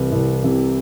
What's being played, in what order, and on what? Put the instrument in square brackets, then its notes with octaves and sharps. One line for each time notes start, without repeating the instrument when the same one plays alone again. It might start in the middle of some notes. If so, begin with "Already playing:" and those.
Already playing: [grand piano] C2 C3 E3
C2
C3